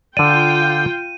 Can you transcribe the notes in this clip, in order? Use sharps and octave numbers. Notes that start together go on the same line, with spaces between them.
D3 F4 D5 G5 D#7